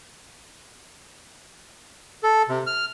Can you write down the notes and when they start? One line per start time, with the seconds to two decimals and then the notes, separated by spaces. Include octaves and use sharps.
2.23 A4
2.49 C3
2.67 F6